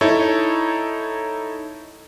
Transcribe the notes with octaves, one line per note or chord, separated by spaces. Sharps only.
D#4 E4 A4 C#5